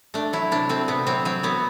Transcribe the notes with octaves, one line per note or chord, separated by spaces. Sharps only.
A3 D4
F#3 E4
C3 D4
A3 C4
C3 B3
F#3 C4
F#3 C4
F#3 B3